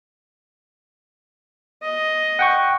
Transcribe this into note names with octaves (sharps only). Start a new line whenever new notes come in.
D#5
F#5 G5 C#6